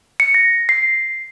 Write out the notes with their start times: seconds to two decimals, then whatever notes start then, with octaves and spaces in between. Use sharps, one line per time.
0.20 C#7
0.35 A#6
0.69 C7